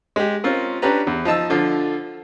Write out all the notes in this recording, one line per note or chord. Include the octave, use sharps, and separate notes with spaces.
G#3 G4
C4 C#4 F4 A#4
C#4 D4 G4 B4 A#5
E2
F3 D#4 A5 E6
D3 F3 F4